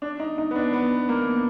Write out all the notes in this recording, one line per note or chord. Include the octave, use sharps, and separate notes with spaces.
D4
D#4
D#4
B3
D4
B3
A#3